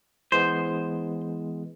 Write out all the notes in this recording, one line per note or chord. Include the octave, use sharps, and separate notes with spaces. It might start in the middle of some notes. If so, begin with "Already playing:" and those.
E3 G#3 B3 C5